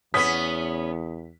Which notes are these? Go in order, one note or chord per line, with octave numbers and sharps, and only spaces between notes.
E2 B3 C#4 D#6 B6